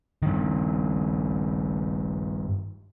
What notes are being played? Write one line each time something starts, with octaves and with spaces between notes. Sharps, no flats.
G2 D#3